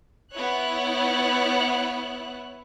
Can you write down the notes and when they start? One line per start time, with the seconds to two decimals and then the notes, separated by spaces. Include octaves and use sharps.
0.31 B3 E4 C#5 F#6